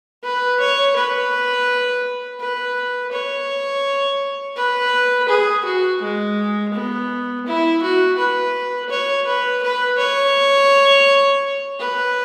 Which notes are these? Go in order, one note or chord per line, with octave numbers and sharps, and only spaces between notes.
B4
C#5
B4
B4
C#5
B4
G#4
F#4
G#3
B3
E4
F#4
B4
C#5
B4
B4
C#5
B4